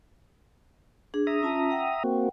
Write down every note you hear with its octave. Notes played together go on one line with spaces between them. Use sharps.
D4 G#4
E5 A#5 D#6
C#4 F4 A5
F#5 G5
A#3 C4 F#4